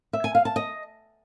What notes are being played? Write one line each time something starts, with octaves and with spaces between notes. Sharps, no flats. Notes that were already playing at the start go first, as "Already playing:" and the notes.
E5
G#5
F5
A5
D#5